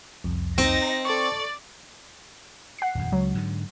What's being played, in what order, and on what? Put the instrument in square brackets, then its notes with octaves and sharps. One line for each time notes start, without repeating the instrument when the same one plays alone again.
[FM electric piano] C2 F2
[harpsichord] C4 [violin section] D#4 A#6
[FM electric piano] A4 C#6 [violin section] D5 A6
[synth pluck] F#5 C7
[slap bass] D#1 F2
[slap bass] C#2 [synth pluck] F#3
[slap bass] G#2 D3